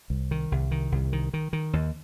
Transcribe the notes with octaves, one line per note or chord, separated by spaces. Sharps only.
C2
D#3
C2
D#3
C2
D#3
D#3
D#3
D#2